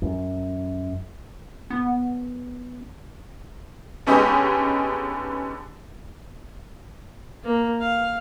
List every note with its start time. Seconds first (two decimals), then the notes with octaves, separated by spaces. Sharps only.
0.02 F#2
1.70 B3
4.07 D3 B3 C#4 D#4 G4 G#4
7.44 A#3
7.81 F5